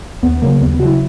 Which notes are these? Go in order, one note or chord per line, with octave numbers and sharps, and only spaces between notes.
D#2 B3
C#3 F#3 A#3
D#2 B3
B3
C#3 F#4
F#3 E4